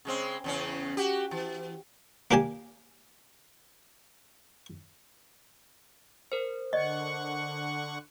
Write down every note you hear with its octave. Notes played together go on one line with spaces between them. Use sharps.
C#3 G#3 C4
E2 C#3 C#4
F#4 G4
E3
A#3 D4 G4 G#5 A5
A#4 C5
D3 D5 D#5 F#5 C#6